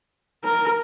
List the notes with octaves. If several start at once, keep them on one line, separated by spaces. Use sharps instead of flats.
A#4